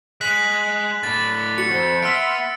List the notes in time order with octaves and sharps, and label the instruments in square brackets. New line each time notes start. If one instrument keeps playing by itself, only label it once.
[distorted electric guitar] G#3 [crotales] F#6 B6 F#7
[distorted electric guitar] A2 D4 [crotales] A6
[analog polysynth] F#4 [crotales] C#7
[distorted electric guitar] F2 [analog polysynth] C5
[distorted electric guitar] B3 [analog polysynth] E5 C6 F6 [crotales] E6 D7